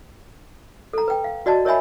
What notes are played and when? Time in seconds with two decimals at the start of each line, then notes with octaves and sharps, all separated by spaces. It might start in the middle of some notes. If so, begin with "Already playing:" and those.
0.93 A4 A#5
1.08 B4 G5
1.24 F5
1.46 F#4 D5 D#5 A5
1.65 A#4 C#5 D#5 E5 G#5 B5